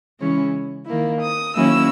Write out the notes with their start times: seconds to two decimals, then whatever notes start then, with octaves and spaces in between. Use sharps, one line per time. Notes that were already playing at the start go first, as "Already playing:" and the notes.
0.18 C#3 E3 G#3 C#4 E4
0.86 D#3 A#3 E4
1.21 D#6
1.55 D#3 F#3 A#3 C#4 E4 E6